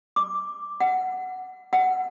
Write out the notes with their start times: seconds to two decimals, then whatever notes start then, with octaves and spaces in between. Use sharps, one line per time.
0.16 D6
0.80 F#5
1.73 F#5